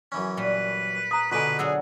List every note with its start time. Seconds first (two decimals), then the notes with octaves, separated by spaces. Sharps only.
0.12 F#2 E3 C#4
0.37 A#2 G3 B4
1.11 A#5 D#6
1.32 B2 D3 G#3 F4 A4 B4 G#5
1.59 F#3 B3 D4 G#4 E6